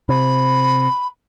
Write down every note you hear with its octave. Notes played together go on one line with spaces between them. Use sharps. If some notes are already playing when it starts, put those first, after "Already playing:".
C3 B5